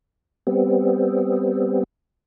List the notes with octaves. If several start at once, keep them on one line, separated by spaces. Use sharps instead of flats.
G3 B3 C4